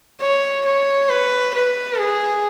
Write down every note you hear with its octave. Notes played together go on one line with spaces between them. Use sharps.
C#5
C#5
B4
B4
G#4